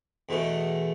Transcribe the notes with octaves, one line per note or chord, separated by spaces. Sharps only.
E2 B2 A3